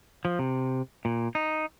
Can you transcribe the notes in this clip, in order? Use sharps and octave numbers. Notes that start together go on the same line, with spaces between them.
F3
C3
A#2
D#4